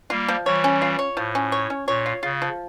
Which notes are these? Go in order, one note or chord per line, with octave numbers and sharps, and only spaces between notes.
G3 A#3 F4
F3
E3 G3 C#5
C#4
F4
C#5
A2 F3
C#4
C#5
C#4
A#2 C#5
F4
C#3 F4
F3